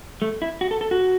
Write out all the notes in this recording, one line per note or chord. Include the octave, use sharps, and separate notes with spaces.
A3
E4
F#4
A4
A4
F#4